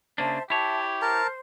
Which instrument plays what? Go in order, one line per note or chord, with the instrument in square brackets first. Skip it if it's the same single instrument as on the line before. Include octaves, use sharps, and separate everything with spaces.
[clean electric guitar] C#3 A#3 D4 [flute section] C5 E5 A5
[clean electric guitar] E4 C#5 [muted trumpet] G4 [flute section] E5 A5
[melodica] A#4 A5 [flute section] C5